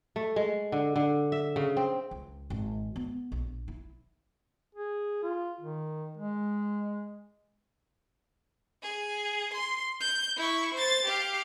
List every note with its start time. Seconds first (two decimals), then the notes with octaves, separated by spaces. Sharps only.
0.16 A3
0.36 G#3
0.72 D3
0.96 D3
1.32 E5
1.56 C#3
1.77 C4
2.11 C#2
2.50 G#1
2.96 B3
3.32 A#1
3.68 E4
4.75 G#4
5.23 F4
5.60 D#3
6.17 G#3
8.82 G#4
9.53 C6
10.00 G6
10.37 E4 C#6
10.73 C5 A6
11.05 G4 F5